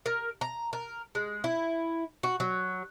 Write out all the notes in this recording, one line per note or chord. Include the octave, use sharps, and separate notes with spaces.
A#4
A#5
A#4
G#3
E4
F#4
F#3